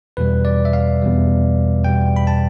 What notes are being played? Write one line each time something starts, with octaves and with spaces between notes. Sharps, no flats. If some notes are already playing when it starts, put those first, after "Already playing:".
E2 B2 G3 B4
D5
E5
F5
E2 B2 G3
E2 B2 G3 G5
B5
A5